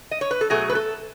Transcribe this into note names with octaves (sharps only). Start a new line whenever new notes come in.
D#5
C#5
B4
A4
B2 F#3 A3 G#4
B4
A4